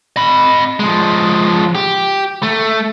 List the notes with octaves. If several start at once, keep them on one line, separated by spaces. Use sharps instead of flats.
D#5 B5
F3 G#3
G4
A3